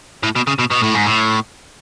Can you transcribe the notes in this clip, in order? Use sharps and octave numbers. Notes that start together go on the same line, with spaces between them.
A2
B2
C#3
B2
B2
A2
G#2
A2